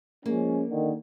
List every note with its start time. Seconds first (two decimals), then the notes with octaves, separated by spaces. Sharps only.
0.26 F3 G#3 A#3 C#4
0.70 D#2 D3 D#3